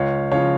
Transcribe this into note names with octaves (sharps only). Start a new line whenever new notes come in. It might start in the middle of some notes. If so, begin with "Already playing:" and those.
Already playing: C#2 C#5 F5
C#3 F3 C#5 F5